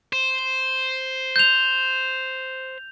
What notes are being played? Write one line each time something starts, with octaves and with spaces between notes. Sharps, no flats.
C5
G6 F7